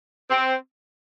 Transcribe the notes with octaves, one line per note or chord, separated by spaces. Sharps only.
C4